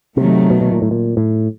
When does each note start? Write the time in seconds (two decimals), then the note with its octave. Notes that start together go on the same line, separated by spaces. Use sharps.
0.17 C3 D#3 F#3 A3
0.50 B2
0.61 B2
0.72 A#2
0.82 A2
0.91 A#2
1.17 A2